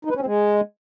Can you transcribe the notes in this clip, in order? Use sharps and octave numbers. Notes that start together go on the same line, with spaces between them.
D#4
B4
C#4
C4
G#3